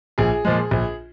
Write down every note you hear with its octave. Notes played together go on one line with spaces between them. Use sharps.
A#1 G#4
A#2 F3 G#3
A#1